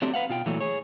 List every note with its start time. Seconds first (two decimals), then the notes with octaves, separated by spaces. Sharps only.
0.02 F#3 A3 C4 D4 G4
0.14 B4 F5 F#5
0.29 B2 F4 G5
0.46 A#2 E3 F#3 A3
0.60 G#4 C#5